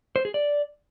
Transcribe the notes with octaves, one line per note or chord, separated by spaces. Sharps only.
C5
G#4
D5